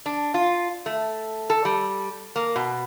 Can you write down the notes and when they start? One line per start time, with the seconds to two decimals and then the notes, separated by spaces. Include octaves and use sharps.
0.06 D4
0.34 F4
0.86 A3
1.50 A4
1.65 G3
2.36 A#3
2.56 B2